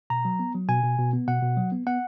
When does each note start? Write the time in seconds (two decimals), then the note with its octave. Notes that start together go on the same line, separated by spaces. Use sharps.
0.10 B2 A#5
0.25 F#3
0.39 B3
0.55 F#3
0.68 B2 G#5
0.83 B2
0.98 B2
1.13 B3
1.28 B2 F#5
1.42 B2
1.57 F#3
1.72 B3
1.86 B3 F#5